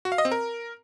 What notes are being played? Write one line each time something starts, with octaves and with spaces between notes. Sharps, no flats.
F#4
F5
D#5
C4
A#4